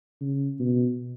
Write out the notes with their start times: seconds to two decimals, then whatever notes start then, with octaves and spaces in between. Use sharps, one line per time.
0.21 C#3
0.60 B2